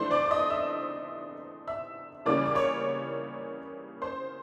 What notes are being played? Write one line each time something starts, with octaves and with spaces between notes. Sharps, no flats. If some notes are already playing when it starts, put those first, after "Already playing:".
Already playing: E3 A3 D4 C5 C6
D5 D6
D6
D#5 D#6
E5 E6
E5 E6
C#3 E3 G3 A#3 C#4 D5 D6
D6
C#5 C#6
C5 C6